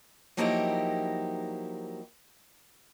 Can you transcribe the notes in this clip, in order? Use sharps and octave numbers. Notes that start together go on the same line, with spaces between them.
F3 F#3 A#3 D#4 E4 G4